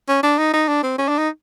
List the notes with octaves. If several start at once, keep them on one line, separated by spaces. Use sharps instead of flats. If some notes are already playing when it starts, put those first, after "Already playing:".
C#4
D4
D#4
D#4
D4
C4
C#4
D4
D#4